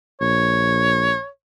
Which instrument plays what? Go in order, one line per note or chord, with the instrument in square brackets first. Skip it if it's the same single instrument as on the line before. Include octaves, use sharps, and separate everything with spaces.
[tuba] A#1 [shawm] C#5